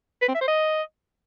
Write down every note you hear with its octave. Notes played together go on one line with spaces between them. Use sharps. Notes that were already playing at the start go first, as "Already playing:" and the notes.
B4
C4
E5
C5
D#5